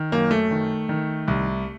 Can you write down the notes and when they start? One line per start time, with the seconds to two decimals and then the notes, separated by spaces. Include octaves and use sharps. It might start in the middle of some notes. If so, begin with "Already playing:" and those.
Already playing: D#3
0.12 F#2 A#3
0.31 A3
0.51 D#3
0.89 D#3
1.28 C2